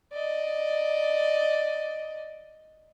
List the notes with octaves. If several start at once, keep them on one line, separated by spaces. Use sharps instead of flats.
D5 D#5